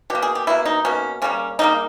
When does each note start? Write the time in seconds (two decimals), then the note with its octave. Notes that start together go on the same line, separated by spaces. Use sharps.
0.10 B2 G4
0.15 A#3
0.22 G#4
0.35 G4
0.47 B2 A#3 E4
0.65 D#4
0.85 B2 A#3 C#4
1.22 C#3 G3 A#3 C#4
1.59 C#3 G3 A#3 D#4